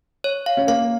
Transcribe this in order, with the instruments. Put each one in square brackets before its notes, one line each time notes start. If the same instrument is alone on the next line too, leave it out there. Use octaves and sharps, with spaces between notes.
[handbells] C#5
F5
[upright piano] C#4
[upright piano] A#3 [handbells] F5